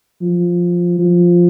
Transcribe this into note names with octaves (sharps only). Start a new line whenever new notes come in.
F3
F3